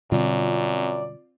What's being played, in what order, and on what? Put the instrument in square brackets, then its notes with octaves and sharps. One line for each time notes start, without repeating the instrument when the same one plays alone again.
[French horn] F#2 [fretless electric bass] B2 D3 G3 [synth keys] C4 F4 [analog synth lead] D5